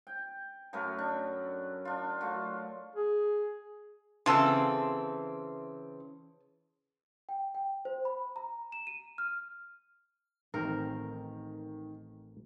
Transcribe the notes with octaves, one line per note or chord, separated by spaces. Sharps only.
G5
F#2 F#3 A3 A#4
D4
D4 F4
F#3 A3 F4
G#4
C#3 E3 C4 F4 A4
G5
G5
C5
B5
A#5
E7
D#7
F6
A1 D#3 C4 A#4